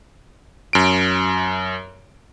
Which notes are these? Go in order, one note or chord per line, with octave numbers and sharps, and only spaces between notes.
F#2 D7